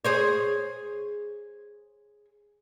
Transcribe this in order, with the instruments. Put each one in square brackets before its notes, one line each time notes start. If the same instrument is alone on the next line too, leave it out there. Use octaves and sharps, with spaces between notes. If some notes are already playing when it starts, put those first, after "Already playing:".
[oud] G#4 C5 C#5